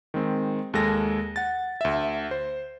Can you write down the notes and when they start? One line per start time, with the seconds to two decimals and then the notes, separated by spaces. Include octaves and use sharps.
0.14 D#3 G#3 C4
0.73 D#2 G#3 A4 A#6
1.36 F#5 A6
1.81 D2 E5
2.31 C5